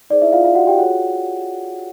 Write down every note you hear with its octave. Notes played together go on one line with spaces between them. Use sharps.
D#4 G#4 C5 D5
E4 E5
F4 F5
F4 F5
F#4 F#5
G4 G5
F4 F#4 G#4 C#5 F#5